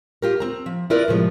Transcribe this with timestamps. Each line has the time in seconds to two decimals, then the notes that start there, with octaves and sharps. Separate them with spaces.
0.22 F4 G4 A#4
0.40 C4 A#5
0.66 F3
0.90 E4 F4 A#4 B4 D5
1.08 A2 C3 F3 G#3